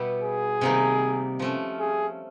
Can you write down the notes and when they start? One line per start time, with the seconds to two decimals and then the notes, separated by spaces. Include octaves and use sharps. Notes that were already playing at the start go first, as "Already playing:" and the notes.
Already playing: B2 G3 B3 E4 G4
0.23 G#4
0.61 C3 D#3 G3 A#3 D#4
1.39 F3 A3 C#4
1.80 G#4